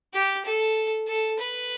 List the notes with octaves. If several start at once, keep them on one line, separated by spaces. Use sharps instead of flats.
G4
A4
A4
B4